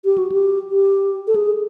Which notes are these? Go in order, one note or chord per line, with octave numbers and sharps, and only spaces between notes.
G4
F#4
G4
G4
A4
G#4